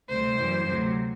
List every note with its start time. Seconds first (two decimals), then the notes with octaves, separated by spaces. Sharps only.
0.09 D2 C3 G3 C5
0.38 F#2 E3 G3
0.67 D2 C3 F#3